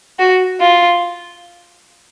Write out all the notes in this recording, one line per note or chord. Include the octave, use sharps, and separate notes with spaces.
F#4
F4